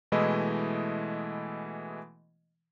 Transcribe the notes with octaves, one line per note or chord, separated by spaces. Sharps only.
B2 E3 G#3 A3 E4 D#5